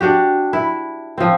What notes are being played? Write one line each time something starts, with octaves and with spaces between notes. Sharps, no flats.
D4 F#4 G4
E4
F3 C4